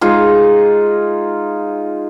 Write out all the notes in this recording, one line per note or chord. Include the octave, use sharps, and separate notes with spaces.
G#3 D#4 F4 G#4